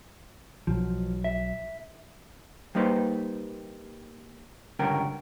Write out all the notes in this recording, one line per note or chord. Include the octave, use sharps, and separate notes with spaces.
B1 B2 F3 F#3
E5
G3 A#3 D#4 B4 C5
C#2 G2 D3 C#4 A#4 G5